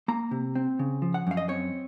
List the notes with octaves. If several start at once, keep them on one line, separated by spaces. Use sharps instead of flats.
A#3 A#5
C3
C4
C#3
F3
F#5
F#2 F5
D#5
C4 C#5